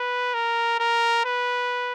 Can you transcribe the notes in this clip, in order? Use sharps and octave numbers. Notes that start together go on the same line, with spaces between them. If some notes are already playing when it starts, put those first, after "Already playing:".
Already playing: B4
A#4
A#4
B4